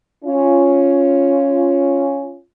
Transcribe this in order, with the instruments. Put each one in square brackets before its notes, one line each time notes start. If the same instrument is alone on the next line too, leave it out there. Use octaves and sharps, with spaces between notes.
[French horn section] C#4 F4